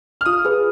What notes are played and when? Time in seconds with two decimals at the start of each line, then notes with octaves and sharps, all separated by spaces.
0.21 F6
0.26 F4 D#6
0.45 G#4 B4